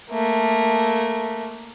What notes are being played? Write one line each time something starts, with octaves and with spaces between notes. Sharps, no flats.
A3 A#3